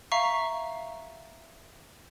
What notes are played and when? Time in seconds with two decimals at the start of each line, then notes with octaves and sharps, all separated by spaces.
0.12 E5 F5 A#5 C#6